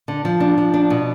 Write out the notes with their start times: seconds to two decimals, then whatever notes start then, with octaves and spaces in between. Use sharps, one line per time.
0.08 D3
0.25 F3
0.40 D4
0.58 F3
0.74 D4
0.90 B2